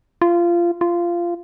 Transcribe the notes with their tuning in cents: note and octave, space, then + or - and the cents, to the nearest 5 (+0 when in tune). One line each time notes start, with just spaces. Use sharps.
F4 -20
F4 -15